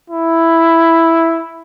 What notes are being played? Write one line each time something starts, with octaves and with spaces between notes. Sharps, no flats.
E4